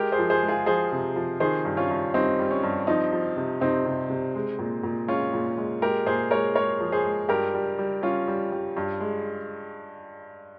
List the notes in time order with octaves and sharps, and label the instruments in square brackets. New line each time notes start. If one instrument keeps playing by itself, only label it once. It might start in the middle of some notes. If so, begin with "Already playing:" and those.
Already playing: [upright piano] G#3 G4 A#4
G#4 C5
F3
G#4 C5
G#3
F4 G#4
F3 G#4 C5
C3
F3
D#3 G#4 C5
G2
C#4 F4
G2
G3 C4 D#4
G3
C#4
G2
F3 C4 D#4
F3
C3
C3 C4 D#4
C3
C3
G#3
A#2
A#2
G#3 C#4 F4
A#2
G#3
G#3 G4 A#4
A#2 G#4 C5
G#3 A#4 C#5
G#3 A#4 C#5
F3
G#4 C5
G#3
G2 G4 A#4
G3
G3
G3 C#4 F4
G3
G3
G2
G#3